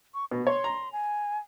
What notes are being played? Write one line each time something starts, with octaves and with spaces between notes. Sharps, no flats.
C#6
B2 F#4
C#5 C6
A#5
G#5